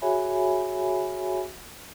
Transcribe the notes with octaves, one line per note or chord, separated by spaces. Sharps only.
F#4 G#4 C#5 E5 G#5 B5